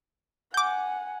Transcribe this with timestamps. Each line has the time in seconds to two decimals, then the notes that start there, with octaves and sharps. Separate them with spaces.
0.54 F#5 G#5 D6 G6